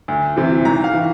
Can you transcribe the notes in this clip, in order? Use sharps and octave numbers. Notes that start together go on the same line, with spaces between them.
D2
C3 E3
G#1 A#5
F5
E3